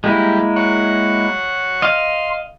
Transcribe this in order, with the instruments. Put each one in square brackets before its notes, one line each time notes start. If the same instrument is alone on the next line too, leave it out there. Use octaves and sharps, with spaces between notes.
[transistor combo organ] G3 [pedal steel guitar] G#3 A#3 E4
[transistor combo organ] C#5 F#5
[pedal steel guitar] D#5 F5 [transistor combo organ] C6